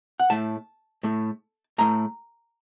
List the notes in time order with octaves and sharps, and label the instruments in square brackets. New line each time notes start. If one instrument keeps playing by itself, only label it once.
[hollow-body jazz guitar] F#5
A2 A3 A5
A2 A3
A2 A3 A#5